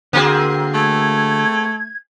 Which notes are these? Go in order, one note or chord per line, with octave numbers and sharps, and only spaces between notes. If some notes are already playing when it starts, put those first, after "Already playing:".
D3 A#3 C4 F#4 G#4
A3 G#6